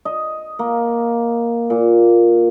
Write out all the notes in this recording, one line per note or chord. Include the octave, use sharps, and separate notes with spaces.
D#5
A#3
A#2